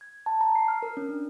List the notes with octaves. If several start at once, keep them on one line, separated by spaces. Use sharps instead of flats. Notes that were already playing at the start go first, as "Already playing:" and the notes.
G#6
A5
A#5
C7
F6
A#4
C#4
D4